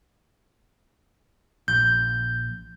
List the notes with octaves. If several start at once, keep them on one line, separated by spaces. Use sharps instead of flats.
A#1 G6